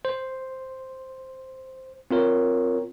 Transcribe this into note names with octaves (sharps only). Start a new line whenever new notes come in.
C5
C4 F4 A#4 C#5